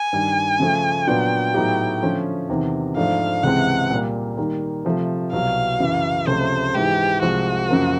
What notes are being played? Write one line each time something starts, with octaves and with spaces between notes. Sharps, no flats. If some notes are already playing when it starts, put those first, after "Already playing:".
Already playing: G#5
G2 D#3 G3
C#3 F3 A3
A#2 F#3 B3 D4 F4 G5
A2 F#3 B3 D#4 G4
D3 F3 A3 C#4 F4
E2 C3 D#3
G#2 F3 A3 D4 F5
C#2 C3 E3 G#3 C4 F#5
A#2 G3 A#3
D#3 G3 A#3
C3 F3 A3
C2 B2 F#3 F5
F#2 C#3 E3
C#2 C3 F3 A3 C#4 C5
G#2 E3 G#3 G4
C2 C3 F3 G#3 F#4
F#2 C#3 F3 A#3